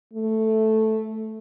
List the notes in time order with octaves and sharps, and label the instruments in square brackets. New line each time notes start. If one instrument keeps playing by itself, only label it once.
[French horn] A3